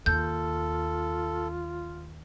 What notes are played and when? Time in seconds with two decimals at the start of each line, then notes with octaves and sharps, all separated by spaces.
0.06 D#2 F4 A4 G6